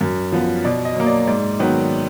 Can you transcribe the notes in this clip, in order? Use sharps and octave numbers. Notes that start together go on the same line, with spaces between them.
F#2
F3 B3
B2 D5
D#5
F#3 A#3
D5
G#2 D5
D#3 F#3 B3